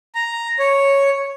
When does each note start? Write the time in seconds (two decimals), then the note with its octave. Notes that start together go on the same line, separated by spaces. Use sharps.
0.15 A#5
0.59 C#5